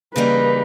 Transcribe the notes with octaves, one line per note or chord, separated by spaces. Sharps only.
C#3 E3 G3 A#3 D#4 B4